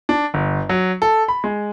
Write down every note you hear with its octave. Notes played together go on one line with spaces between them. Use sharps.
D4
G1
F#3
A4
B5
G#3